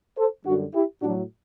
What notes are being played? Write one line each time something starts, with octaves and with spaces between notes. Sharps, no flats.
A4 C5
F#2 D3 G3 D4 F#4
E4 G4
A2 F#3 D4 F#4